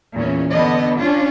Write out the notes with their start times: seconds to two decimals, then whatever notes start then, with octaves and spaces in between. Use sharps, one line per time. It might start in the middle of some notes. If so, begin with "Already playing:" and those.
0.13 E2 A#2 C#4
0.53 D3 B3 D#5
1.00 C#4 D4 F4